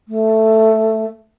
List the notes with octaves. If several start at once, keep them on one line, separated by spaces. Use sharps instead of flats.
A3